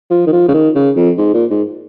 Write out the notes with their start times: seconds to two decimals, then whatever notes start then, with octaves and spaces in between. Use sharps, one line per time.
0.10 F3
0.27 D#3
0.32 F3
0.48 C#3
0.54 D#3
0.75 C#3
0.96 F2
1.18 G#2
1.34 A#2
1.50 G#2